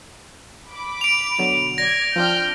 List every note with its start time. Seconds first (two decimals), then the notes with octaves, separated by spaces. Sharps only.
0.70 B5 D6
1.01 D7 F7
1.39 B2 D3 F#3
1.78 D5 G#6 A#6
2.16 F3 C4 D4 G5 F6 G6